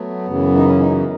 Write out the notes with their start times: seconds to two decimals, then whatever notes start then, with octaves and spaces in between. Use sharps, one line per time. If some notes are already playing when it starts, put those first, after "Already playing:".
Already playing: F#3 A3 B3
0.26 F#2 C#3 E3
0.55 D#4
0.66 C#4
0.79 D#4
0.91 C#4